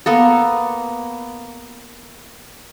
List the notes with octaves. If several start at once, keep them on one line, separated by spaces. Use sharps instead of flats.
A#3 B3 A4